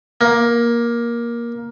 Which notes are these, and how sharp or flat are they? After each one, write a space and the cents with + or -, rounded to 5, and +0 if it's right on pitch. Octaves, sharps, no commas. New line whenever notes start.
A#3 +15